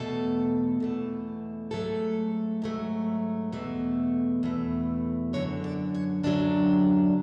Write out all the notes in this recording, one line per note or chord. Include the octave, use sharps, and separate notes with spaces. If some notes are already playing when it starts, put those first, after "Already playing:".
Already playing: E2 B2 A3 A4
E2 B2 A3
G#2 F#3 A3 A4
G#2 F#3 A3
E2 B2 A3
E2 B2 A3
F#2 D3 F#3 C#5
D5
C#5
F#2 D3 F#3 D4